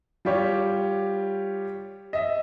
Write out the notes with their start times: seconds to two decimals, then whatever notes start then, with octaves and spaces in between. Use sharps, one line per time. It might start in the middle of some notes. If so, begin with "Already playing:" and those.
0.25 G3 F4 G4 C#5
2.13 D#5 E5